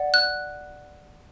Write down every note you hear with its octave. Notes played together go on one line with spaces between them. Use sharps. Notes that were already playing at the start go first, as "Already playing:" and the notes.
Already playing: D5 F#5
F#6